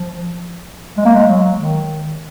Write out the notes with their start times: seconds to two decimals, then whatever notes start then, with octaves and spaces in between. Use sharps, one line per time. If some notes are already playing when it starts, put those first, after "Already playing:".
Already playing: F3
0.97 G#3
1.05 A#3
1.15 G#3
1.27 F#3
1.58 D#3